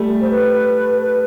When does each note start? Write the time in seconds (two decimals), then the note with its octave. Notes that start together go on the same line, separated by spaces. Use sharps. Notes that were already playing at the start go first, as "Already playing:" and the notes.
Already playing: G3 A3
0.21 C5
0.31 B4
1.01 B4